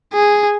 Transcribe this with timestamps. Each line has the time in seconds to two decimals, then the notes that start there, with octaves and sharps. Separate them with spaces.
0.13 G#4